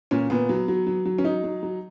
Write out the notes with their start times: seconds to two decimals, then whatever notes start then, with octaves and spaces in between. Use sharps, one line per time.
0.11 A#2 C#4
0.30 A#2 B3
0.49 F#3
0.68 F#3
0.87 F#3
1.05 F#3
1.18 C#4
1.24 F#3 D#4
1.44 F#3
1.63 F#3